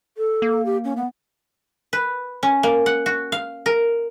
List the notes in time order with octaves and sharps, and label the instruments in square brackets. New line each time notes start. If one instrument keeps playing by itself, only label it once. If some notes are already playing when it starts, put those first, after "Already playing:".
[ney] A4
[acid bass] A#3
[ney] G4
C#4
B3
[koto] B4
C#4
A#3
F#5
F#4
F5
A#4